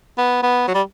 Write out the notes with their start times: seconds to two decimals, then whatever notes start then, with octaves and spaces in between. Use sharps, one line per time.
0.18 B3
0.43 B3
0.68 F#3
0.75 G3